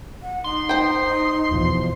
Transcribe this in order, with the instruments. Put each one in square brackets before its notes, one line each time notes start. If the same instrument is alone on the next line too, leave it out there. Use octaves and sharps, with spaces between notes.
[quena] F#5
[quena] D#4 [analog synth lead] C6
[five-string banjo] C5 G5
[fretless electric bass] E2 B2 F3